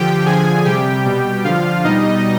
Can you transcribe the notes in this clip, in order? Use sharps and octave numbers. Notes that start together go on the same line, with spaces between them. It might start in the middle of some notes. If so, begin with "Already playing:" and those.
Already playing: D3 F3 G4 G5
D3 F3 G#4 G#5
C3 G3 G4 G5
B2 G3
D3 F3 F4 F5
B2 G3 D#4 D#5